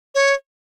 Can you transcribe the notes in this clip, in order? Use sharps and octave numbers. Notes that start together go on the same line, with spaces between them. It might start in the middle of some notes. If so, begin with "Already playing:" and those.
C#5